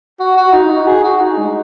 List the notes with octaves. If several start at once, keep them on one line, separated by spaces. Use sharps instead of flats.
F#4
F#4
D#4
F#4
G#4
F#4
D#4
G#3